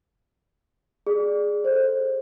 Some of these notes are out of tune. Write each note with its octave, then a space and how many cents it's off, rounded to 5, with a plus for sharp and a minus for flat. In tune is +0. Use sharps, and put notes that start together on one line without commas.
G#4 +0 D5 +10
A4 +0 C5 +20